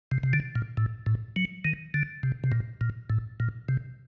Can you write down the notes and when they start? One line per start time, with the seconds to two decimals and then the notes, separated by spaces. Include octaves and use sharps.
0.11 C3
0.23 C3
0.33 D3
0.55 A#2
0.77 A2
1.06 A2
1.36 F#3
1.65 D#3
1.94 D3
2.23 C3
2.44 C3
2.52 A#2
2.81 A#2
3.10 A2
3.40 A#2
3.69 C3